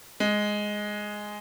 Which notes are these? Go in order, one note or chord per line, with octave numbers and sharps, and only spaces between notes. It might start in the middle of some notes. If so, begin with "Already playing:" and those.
G#3